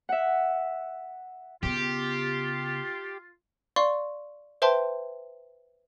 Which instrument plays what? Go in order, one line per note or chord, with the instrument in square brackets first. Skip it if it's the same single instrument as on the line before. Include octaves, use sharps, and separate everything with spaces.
[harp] E5 F#5
[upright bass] C#3 B3 [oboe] F4 [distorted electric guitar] G4
[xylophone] D5 F5 C6 C#6
B4 C5 E5 G5 A5 C6